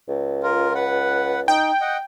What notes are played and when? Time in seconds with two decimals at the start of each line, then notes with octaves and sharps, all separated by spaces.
0.09 C#2
0.43 F4 A#4
0.75 B4 F#5
1.48 D#4 G5
1.81 D#5 F#5